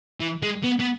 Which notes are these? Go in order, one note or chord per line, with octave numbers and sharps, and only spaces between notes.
E3
G#3
B3
B3